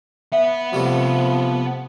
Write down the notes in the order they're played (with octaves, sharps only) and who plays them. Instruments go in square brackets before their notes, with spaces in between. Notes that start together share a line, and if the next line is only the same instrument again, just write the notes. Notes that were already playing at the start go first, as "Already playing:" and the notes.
[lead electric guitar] B3 F#5 [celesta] E5
[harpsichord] C3 G3 A3 [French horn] F3